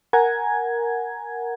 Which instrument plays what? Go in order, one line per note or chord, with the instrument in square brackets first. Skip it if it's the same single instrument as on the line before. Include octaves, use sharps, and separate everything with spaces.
[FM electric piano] A#4 F#5 G#5 A#5 G#6